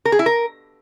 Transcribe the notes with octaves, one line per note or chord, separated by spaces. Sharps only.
A#4
G#4
E4
A#4